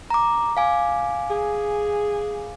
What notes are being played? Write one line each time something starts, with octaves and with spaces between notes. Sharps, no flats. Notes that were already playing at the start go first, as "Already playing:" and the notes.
A#5 D6
F5 G#5 D6
G#4